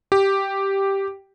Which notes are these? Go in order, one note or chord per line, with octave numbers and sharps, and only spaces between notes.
G4